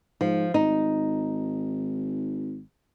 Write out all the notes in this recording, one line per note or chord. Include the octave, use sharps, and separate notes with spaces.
G#2 F3
G#1 D#4